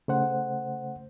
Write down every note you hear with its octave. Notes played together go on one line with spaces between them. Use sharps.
C#3 A3 C5 F#5